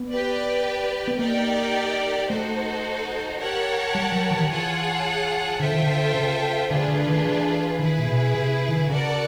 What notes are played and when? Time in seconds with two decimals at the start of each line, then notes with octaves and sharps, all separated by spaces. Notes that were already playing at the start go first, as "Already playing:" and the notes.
Already playing: B3
0.09 G4 B4 D5
1.08 B3
1.19 A#3 D#4 G4 A#4 D5 G5
2.29 A3 D#4 F#4 A4 C5
3.40 G4 A#4 C#5 F#5 A5
3.95 G3
4.12 F#3
4.31 E3
4.40 D#3
4.49 E3 F4 G#4 C#5 F#5 A5
5.60 D3 F4 A4 C5 E5 G5
5.72 D#3
5.83 D3
6.14 C#3
6.70 D3 A3 D4 F4 G#4 B4
6.88 D3
7.07 D#3
7.26 E3
7.80 D#3 E4 G#4 B4
7.99 A#2
8.08 B2
8.35 C3
8.69 D#3
8.80 D3
8.90 C#3 F#4 A#4 D5 F#5 A5